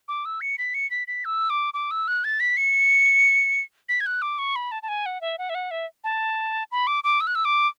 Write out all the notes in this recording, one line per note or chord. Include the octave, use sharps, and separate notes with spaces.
D6
E6
C#7
B6
C#7
B6
B6
E6
D6
D6
E6
F#6
A6
B6
C#7
B6
G#6
F#6
D6
C#6
B5
A5
A5
G#5
F#5
E5
F#5
E5
F#5
E5
A5
B5
D6
D6
E6
F#6
E6
D6